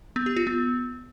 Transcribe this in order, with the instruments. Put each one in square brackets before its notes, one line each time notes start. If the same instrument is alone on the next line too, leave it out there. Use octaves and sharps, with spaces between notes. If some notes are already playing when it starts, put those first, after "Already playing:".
[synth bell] B3
G4
F4
B3